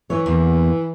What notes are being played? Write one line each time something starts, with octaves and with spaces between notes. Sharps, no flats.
E3 C#5
E2 A#3